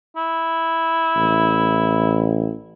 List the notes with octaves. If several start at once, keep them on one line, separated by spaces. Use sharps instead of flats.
E4
A1